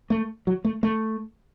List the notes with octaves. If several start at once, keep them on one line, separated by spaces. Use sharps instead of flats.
A3
F#3
A3
A3